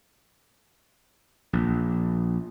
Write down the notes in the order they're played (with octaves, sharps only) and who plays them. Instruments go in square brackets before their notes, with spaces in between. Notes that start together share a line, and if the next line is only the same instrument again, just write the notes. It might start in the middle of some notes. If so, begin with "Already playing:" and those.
[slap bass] A#1